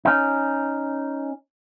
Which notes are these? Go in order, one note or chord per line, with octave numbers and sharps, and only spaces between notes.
C#4 D#4